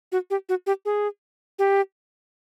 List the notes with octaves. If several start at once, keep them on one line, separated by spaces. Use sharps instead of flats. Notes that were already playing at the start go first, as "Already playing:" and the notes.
F#4
G4
F#4
G4
G#4
G4